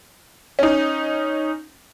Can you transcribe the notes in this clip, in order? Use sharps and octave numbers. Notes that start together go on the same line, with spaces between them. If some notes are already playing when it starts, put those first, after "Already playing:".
C#4 D#4